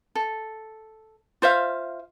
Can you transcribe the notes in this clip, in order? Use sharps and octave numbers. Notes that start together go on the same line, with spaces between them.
A4
F4 C5 E5 F5